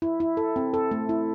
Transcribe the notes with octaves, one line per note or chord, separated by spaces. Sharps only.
E4
E4
A4
C4
A4
A3
E4